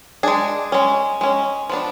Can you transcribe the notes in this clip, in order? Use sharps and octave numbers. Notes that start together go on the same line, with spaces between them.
G#3 D4 G#4
G#3 C#4
G#3 C#4
F3 B3 D4